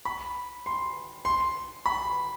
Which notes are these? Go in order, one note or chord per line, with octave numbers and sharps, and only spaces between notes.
B5
C6
C6
B5